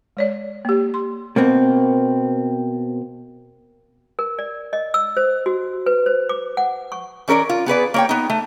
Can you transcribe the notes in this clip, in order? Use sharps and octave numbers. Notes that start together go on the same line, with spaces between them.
G#3 C#5 D5
A#3 G4
C6
B2 A#3 C4
A#4
D5
D#5
E6
C5
F#4
B4
C5
D6
F#5
C#6
E3 C#4 A#4 B4 D5
F4
B3 G#4 B4 D5
A#3 C#5 G5
B3 D#4
A3